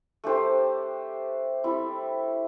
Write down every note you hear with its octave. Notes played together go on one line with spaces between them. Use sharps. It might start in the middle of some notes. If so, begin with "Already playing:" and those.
A3 D4 G4 C5
G3 C4 E4